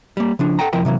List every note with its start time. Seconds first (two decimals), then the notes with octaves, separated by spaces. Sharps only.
0.17 G3 A#3
0.39 C#3 F3 D4
0.59 A4 F#5 G5 A#5
0.73 C2 F2 F3 E4 A#4 G5
0.85 C3 E3 F#3 A#3